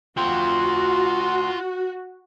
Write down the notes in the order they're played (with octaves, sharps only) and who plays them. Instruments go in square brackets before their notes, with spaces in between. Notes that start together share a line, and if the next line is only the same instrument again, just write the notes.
[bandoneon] D2 C6 [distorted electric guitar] F4 G5 [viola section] F#4